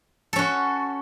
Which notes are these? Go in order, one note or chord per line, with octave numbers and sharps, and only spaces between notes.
C#4 F#4 A4